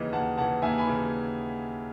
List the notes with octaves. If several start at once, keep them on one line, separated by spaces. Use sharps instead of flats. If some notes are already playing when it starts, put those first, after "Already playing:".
Already playing: D#2 C#3 E3 D#5
D#2 F#5 A5
C#3 E3 F#5 A5
D#2 E5 G#5
G#5 B5
C#3 E3